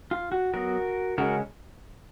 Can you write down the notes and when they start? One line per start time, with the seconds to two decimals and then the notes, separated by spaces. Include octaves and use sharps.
0.11 F4
0.32 F#4
0.54 F#3 B3 F#4 A#4
1.18 C#3 G#3 C#4 F#4 A#4